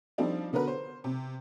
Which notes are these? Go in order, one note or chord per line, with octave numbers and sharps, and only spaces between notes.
F3 G3 C4 D4 D#4
D3 B3 F#4 A#4 B4
C5
C3